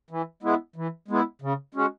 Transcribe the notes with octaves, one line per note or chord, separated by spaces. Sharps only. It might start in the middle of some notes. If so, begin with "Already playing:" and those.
E3
G#3 B3 E4
E3
G#3 B3 E4
C#3
G#3 C#4 F#4